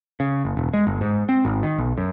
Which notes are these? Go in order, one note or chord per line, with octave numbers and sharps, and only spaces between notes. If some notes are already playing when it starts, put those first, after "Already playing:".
C#3
F#1
E1
G#3
G1
G#2
C4
G#1
D#3
B1
F#2